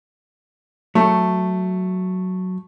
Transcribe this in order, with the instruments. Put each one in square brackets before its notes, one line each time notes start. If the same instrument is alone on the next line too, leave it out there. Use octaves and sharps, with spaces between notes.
[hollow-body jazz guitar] F#3 [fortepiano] A3